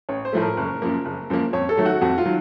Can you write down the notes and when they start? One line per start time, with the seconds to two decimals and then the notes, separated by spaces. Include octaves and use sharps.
0.09 A1 C#5
0.25 C5
0.33 A2 F3 A3
0.42 A#4
0.57 F#1
0.82 F#2 F3 A#3
1.05 F#1
1.30 F#2 F3 A#3
1.53 F2 C#5
1.69 A4
1.77 D#3 F#3 A3
1.86 F#4
2.01 F2 F#4
2.18 F4
2.25 D#3 F#3